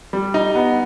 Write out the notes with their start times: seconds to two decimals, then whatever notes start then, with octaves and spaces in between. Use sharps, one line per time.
0.13 G3
0.34 D#4
0.55 B3